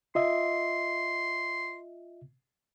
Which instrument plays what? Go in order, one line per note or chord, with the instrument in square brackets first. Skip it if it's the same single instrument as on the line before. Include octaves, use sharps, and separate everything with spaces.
[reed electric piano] F4 D#5 E5 [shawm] C6